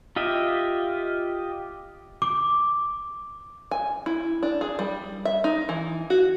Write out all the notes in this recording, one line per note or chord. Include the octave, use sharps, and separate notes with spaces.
F4 G4 D#5 E5
D6
G#5
E4
D4
G#4
G3
E5
D#4
E3
F#4